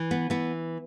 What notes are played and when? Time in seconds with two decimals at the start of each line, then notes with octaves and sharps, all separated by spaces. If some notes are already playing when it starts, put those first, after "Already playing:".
Already playing: E3
0.11 B3
0.30 E3 B3